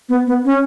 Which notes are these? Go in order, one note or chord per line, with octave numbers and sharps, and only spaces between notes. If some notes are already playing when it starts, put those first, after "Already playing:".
B3
B3
C#4